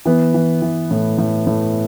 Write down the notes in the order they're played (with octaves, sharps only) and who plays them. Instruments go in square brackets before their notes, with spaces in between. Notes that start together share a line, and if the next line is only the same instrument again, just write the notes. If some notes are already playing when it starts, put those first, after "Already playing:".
[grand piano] E3 B3
E3
E3
A2
A2
A2